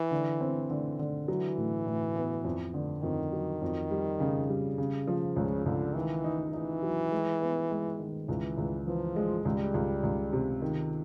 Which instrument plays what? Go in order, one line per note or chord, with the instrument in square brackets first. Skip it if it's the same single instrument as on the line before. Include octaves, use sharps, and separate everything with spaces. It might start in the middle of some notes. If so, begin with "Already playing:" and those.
Already playing: [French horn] E3
[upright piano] D3
C4
D3
D3
[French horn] E3 [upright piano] F#3
[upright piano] A2
A2
B3
F2
D3
[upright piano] F2 [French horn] D#3
[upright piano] F#3
F2
G3
C#3
G3
C#3
F3
[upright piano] C#2 [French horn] C#3
[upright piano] C#2 [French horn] D3
[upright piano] D#3 [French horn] E3
[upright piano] D#4
[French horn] E3 [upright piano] D#4
[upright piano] F#3
G#3
B3
G#3
D#3
[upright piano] C#2 [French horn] E3
[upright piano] C#2
[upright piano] E3 [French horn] F3
[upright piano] G#3
[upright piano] C#2 [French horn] G3
[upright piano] C#2
C#2
C3
D#3